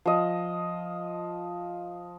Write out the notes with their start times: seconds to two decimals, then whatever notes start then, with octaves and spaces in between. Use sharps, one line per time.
0.06 F3 D#5